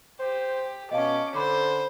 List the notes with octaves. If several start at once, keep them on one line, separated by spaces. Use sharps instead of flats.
G4 C5
B2 C#4 D#5 F5 A5 D6
D3 C5 B5 C6 D6